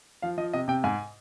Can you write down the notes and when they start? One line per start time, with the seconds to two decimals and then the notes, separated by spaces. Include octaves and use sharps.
0.22 F3 F5
0.38 F3 D#5
0.53 C3 D#5
0.68 C3 G5
0.84 G#2 G#5